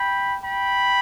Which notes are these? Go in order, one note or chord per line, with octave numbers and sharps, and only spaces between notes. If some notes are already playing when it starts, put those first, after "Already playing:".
Already playing: G5 B5
G5 B5